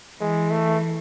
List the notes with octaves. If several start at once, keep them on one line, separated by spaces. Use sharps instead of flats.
E3 G#3
A3